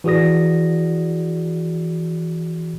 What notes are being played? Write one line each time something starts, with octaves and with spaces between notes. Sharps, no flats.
E3 F#4 G#4 D5 D#6 A#6